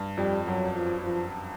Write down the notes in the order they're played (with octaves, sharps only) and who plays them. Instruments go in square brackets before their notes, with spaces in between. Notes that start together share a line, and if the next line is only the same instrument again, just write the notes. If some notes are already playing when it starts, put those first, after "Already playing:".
Already playing: [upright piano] G2
[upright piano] F2 [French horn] G3
[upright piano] F#2 [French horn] F#3
[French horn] F3
F3